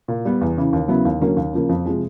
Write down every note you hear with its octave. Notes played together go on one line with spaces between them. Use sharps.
A#2
G3 B3
E2
C#3 E3
D#2
C#3 F#3 B3 E4
D#2
D3 F#3 A#3 C#4
D#2
C#3 F3 A#3
F2
C3 F3 G#3